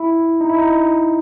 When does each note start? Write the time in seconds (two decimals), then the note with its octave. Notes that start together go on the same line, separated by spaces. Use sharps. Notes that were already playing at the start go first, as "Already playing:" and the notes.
Already playing: E4
0.41 D#4
0.50 E4
0.59 D#4